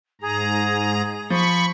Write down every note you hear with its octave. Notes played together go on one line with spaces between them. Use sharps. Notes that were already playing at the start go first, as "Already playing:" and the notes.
G#2 G#4 A#5
F3 B5 C#6